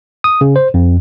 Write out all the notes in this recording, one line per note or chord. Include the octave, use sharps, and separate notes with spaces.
D#6
C#3
C5
F2